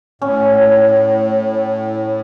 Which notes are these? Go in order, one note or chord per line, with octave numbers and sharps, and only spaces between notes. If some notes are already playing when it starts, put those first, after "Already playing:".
A2 C#4